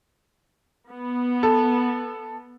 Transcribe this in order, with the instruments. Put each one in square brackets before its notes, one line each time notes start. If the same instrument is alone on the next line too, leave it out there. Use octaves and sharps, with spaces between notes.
[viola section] B3
[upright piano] A4